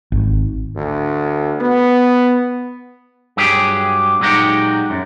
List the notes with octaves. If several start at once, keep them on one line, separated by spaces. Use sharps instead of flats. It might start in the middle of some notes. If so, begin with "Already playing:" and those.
G#1
D2
B3
G2 F#3 G4 G#4
A#2 F#3 G#3 D#4 F#4 G4
F#2